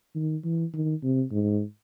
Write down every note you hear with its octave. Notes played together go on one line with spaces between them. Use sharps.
D#3
E3
D#3
C3
G#2